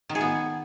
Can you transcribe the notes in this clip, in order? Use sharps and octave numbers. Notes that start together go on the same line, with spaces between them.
D#3
G#4
B3